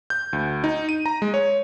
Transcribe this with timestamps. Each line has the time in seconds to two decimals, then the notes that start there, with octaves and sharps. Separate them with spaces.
0.10 G6
0.33 D2
0.64 D#4
0.89 D#7
1.06 A#5
1.22 G#3
1.34 C#5